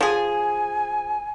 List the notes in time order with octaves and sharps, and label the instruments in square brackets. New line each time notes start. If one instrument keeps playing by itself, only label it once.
[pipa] F3 G#4 [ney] G#5